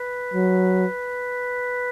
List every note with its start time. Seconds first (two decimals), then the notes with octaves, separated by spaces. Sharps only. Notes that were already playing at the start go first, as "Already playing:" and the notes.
Already playing: B4
0.34 F#3